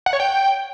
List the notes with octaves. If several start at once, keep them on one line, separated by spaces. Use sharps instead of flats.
F#5
C#5
G5